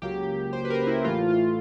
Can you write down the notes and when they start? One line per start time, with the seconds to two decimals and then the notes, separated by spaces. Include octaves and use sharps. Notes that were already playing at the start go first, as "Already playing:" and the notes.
0.02 C#2 C#3 F#3 A#3 G4
0.53 C5
0.65 B4
0.70 A#4
0.87 E4
1.04 A2 E3 A3 F4
1.30 F4